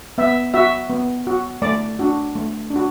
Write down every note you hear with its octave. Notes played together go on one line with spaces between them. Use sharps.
B3 E5
F#4 E5
B3
F#4
A3 D5
D4 F#4
A3
D4
F#4